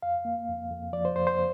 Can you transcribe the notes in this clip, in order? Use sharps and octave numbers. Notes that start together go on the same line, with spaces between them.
F2 F5
A#3
F2
F2
F3 D5
C5
F2 C5
C5